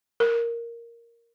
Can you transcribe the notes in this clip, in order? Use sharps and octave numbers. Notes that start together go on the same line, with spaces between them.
A#4